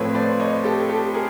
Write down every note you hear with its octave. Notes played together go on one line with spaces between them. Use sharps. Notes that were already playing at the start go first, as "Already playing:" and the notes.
Already playing: A2 F3 A3 C4 B4 C#5
C5 D5
C#5 D#5
G4 A4
G4 A4
G#4 A#4